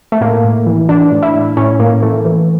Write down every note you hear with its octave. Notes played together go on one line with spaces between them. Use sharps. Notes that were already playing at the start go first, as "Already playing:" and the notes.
A3
A2 A#3
A2
E3
E3 D4
A2
E4
A2
A2 C#4
A2 A#3
E3 A3
E3